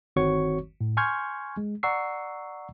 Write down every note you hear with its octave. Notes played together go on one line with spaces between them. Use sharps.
G1 D#3 C4 F#4 C#5 C#6
A2
G#5 C6 C#6 F6 G6 G#6
G#3
D5 F#5 A#5 C#6 E6 C7